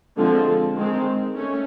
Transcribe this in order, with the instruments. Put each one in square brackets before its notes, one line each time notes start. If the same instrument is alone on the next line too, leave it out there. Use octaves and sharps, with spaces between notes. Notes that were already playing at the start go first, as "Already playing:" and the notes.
[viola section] D3 F3 G#3 C4
D#3 G#3 C4
A3 C#4